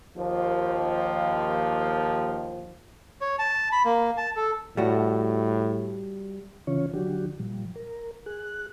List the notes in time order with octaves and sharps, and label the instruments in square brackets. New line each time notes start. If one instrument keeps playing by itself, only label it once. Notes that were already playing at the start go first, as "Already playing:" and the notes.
[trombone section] D#2 F3
[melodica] C#5
A5
B5
A#3
A5
A4
[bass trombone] A2 [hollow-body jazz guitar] G3 F#4
[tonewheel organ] C#3 E3 C#4 F4 C#5
D3 F3 F#3 D4 F#4 G4
A#2 F3 G3
A#4
G#4 F#6